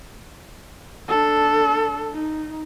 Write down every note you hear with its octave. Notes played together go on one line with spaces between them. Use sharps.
D4 A4
D#4